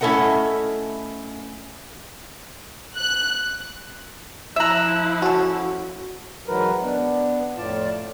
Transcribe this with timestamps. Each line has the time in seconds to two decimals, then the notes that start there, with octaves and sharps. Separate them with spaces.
0.01 A3 C#4 E4 A4 D#5 F#5
2.97 F#6
4.56 F3 E4 E5 A#5 E6 F#6
5.22 C#4 F#4 A4
6.48 G#2 D#3 E3 F#3 A#4 B4
6.82 B3 D4
7.57 F2 A2 F4 D5 A5